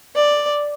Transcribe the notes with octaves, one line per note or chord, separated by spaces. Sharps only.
D5